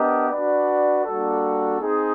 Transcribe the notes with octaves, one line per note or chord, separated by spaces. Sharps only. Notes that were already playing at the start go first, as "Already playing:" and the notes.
Already playing: B3 D4 G4 A#4 D#5
D4 F#4 B4 D5
G3 A#3 D4 F#4 A4
C4 D#4 G#4